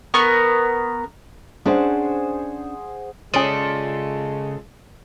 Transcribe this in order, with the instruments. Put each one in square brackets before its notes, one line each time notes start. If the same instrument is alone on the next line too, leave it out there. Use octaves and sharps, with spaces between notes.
[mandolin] B3 A#4 C#6
[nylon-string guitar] C#4 D4 [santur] G#4 C5 F#5
[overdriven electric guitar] C#3 [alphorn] G#3 [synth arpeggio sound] C#4 D#6 [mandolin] F4 A4 D5